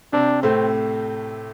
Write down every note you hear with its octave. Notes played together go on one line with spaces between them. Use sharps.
C3 C4 D4
A2 A3 C4